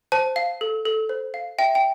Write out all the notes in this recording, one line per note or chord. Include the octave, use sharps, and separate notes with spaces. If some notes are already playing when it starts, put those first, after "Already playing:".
C5 A5
F5
A4
A4
C5
F5
E5 G5
G5